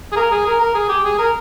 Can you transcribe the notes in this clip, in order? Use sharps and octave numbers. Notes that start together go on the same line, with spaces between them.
G#4
A#4
G#4
A#4
A#4
G#4
G4
G#4
A#4